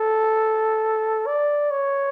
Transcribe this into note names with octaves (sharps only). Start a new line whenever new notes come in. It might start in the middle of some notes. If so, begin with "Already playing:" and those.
Already playing: A4
D5
C#5